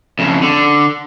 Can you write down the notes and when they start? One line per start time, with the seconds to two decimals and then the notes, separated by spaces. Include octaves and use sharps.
0.19 F2 C#3
0.43 D3